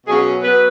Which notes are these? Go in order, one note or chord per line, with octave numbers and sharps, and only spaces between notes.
B2 F#3 C#4 G#4
F#3 B3 B4